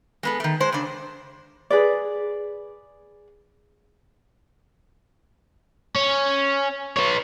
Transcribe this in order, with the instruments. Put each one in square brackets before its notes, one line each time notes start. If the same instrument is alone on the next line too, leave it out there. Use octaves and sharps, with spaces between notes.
[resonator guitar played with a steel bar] G#3 B3 A4
D#3 A3
G#3 C5
C#3 D4
[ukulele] G#4 B4 D5
[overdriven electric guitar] C#4
B4 C#5